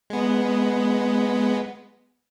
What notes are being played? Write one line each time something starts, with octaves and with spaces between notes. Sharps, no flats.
G#3 B3